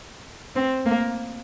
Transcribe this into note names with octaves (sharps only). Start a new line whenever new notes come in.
C4
A#3